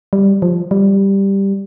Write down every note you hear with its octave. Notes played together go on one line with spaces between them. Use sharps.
G3
F3
G3